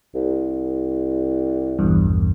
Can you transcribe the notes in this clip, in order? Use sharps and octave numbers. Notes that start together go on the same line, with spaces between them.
C2
A#1 E2 G2